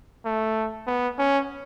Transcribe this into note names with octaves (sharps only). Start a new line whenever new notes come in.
A3
B3
C#4